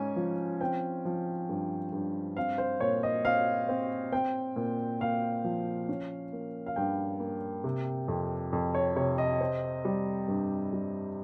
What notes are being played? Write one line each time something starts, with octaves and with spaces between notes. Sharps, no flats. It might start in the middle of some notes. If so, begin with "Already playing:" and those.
Already playing: G#2 C#4 G#5
F3
C4 G5
F3
G2
G2
C4 F5
C5
A#2 C#5
D#5
C4 F5
C4
C4 G5
A#2
A#2 F5
F3
C#4
A#3
F5
G2 G5
A#3
C3
F2
F2
C#5
C3 C#5
D#5
C4
G3
G2
G3